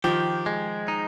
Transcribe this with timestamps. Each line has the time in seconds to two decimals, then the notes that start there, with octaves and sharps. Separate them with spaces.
0.04 D#3 F3 G4
0.46 G#3
0.88 D#4